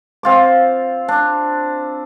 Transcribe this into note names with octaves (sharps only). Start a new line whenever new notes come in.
C4 F4 D6
D4